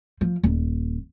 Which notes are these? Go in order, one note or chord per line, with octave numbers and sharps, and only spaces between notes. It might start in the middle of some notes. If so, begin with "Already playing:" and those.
F3
D#1